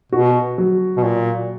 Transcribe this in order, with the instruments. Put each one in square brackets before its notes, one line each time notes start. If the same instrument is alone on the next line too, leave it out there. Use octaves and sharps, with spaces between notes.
[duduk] B2 [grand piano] F#4
[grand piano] F#3
[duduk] B2
A#2